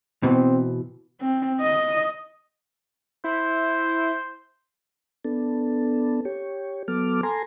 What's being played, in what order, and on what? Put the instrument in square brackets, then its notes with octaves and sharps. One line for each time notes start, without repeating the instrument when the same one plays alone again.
[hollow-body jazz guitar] B2 E3 [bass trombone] C4
[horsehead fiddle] C4
D#5
[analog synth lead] E4 [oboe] C5
[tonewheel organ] B3 D4 A4
G4 C#5
F#3 B3 A4 D6 F6
A4 G#5 A#5 C6